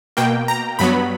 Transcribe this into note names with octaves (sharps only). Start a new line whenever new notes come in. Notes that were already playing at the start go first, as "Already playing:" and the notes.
B2 A#3 G5
A#5
G2 F#3 B3 B5